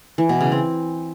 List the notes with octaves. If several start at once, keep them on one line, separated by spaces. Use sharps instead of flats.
E3
B2
C#3
C4